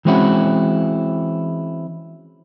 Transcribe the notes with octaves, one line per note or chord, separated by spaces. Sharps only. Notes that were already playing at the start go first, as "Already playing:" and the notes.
E3 G#3 C4 C#4 E4 F#4